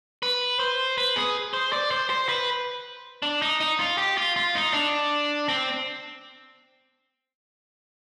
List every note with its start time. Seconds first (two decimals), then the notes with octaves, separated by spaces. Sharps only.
0.23 B4
0.60 C5
0.98 B4
1.16 G#4
1.53 C5
1.73 D5
1.91 C5
2.10 C5
2.29 B4
3.22 D4
3.42 D#4
3.60 D#4
3.79 F4
3.98 G4
4.18 F4
4.36 F4
4.55 D#4
4.73 D4
5.49 C4